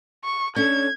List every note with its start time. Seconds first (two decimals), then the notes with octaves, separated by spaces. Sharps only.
0.25 C#6
0.56 C#4 D4 A4 G#6